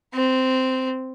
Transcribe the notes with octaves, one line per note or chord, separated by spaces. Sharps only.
C4